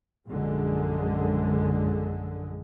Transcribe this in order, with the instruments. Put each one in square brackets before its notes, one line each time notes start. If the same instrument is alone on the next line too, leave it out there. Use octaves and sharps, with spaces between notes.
[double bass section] A#1 F#2 D3 G#3